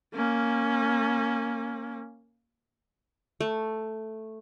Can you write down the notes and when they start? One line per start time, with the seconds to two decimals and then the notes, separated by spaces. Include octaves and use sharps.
0.14 A#3 C#4
3.41 A3